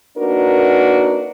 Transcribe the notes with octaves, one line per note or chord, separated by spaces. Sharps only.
A#3 D4 D#4 F#4 A#4 B4